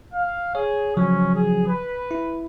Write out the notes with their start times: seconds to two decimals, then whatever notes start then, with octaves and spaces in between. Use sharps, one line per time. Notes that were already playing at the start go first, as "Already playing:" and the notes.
0.14 F5
0.55 G#4 C#5
0.97 C#3 F3 F#3 C#4
1.35 G#4
1.68 B4
2.11 E4